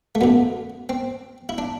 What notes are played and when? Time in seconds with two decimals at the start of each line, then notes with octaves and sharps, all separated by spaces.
0.15 A3
0.21 F#2 D3 B3
0.89 C4
1.49 E4
1.58 D4